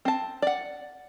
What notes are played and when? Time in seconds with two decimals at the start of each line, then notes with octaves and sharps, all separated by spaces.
0.05 C4 A5
0.42 D5 F#5